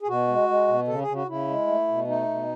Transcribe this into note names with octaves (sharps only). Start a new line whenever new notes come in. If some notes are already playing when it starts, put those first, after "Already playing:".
G#4
B2 F#4
G#3
G#3
B2
C#3 A4
G#4
C#3
F#4
C#3 E4
G#3
A3
B2
A3 D#4
B2